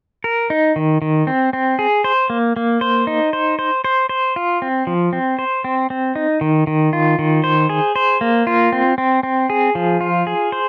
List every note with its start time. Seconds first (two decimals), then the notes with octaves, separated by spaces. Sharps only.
0.24 A#4
0.50 D#4
0.76 D#3
1.02 D#3
1.27 C4
1.53 C4
1.79 G#4
2.04 C5
2.30 A#3
2.56 A#3
2.81 C5
3.07 D#4
3.33 C5
3.59 C5
3.84 C5
4.09 C5
4.36 F4
4.62 C4
4.87 F3
5.13 C4
5.39 C5
5.64 C4
5.90 C4
6.15 D#4
6.41 D#3
6.67 D#3
6.93 F4
7.19 D#3
7.44 C5
7.69 G#4
7.96 C5
8.21 A#3
8.47 F4
8.72 C4
8.98 C4
9.23 C4
9.50 G#4
9.75 F3
10.01 F4
10.27 G#4
10.52 C5